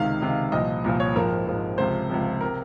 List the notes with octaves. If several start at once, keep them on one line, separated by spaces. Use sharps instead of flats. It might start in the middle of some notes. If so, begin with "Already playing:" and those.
Already playing: C#2 C3 D#3 F5
C#2 C3 D#3
C2 A#2 F3 D#5
C2 A#2 F3
C#5
G#1 G#2 F3 A#4
G#1 G#2 F3
C#2 C3 F3 C5
C#2 C3 F3
C3 A#4